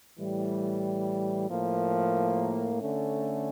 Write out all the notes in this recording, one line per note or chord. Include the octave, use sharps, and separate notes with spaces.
A2 E3 G3
A2 F3 A#3
D3 A3 C#4